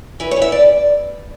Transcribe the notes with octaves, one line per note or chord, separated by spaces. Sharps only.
E3 B4
C#5
E3
E5
D5